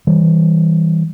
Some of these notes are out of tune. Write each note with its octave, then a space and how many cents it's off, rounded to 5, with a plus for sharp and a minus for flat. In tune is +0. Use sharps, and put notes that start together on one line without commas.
E3 -25 G3 +0